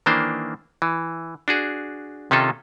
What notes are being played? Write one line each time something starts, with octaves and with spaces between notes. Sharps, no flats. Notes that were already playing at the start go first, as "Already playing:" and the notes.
D#3 E3 A#3 D4 C5
E3
D4 F#4 G#4
C3 D#3 C#4 D#4 F4 A4